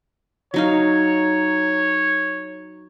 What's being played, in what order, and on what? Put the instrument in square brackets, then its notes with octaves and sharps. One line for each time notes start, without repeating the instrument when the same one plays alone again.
[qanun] F#3 D#4 F5 [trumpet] C#5